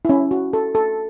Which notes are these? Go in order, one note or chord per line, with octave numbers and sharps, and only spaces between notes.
E4
C#4
F#4
A4
A4